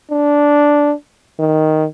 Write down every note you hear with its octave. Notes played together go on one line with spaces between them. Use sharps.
D4
D#3